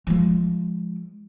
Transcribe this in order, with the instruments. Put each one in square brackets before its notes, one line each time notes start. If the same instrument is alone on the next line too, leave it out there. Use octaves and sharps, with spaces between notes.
[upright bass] F3 G#3